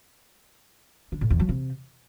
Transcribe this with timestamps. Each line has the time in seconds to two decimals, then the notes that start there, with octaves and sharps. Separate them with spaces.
1.12 D3
1.21 A2
1.30 E2
1.40 F#3
1.49 C3